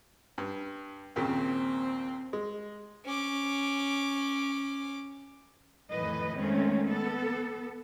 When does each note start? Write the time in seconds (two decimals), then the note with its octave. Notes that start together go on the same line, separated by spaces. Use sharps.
0.38 G2
1.16 D#2 A#2 C#3 C4
2.33 G#3
3.05 C#4 D6
5.91 F2 A2 D#3 E3 B4 D#5
6.38 D#3 G#3 A3 C4 C#4
6.87 B3 A4